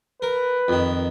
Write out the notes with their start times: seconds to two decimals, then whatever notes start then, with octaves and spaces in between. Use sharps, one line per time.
0.22 A#4 B4
0.68 F2 D#3